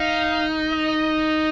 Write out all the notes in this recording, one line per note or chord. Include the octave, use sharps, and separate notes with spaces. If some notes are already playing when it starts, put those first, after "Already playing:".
Already playing: D#4 F5
D#5